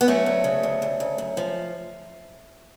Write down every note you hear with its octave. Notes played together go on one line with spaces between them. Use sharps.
B3
F#3 A3 C#4
D2
C#3
D2
D2
D2
F#2
F3